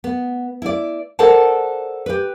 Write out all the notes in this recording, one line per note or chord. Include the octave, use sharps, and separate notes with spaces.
B3
E4 D5
A4 A#4 C5 D5 F#5 A5
G4 B4